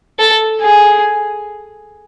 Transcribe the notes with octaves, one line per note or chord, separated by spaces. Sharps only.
A4
G#4